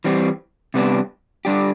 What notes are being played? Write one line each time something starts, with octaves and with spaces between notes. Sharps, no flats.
E3 G3 C4
C3 G3 B3 D4
D3 G3 D4 G4